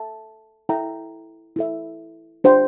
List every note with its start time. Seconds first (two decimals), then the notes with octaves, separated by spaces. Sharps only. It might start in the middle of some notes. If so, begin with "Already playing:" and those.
Already playing: A4 E5 A5
0.69 E4 A4 E5 G5 A#5
1.56 E4 A4 E5
2.44 D4 G4 C5 G5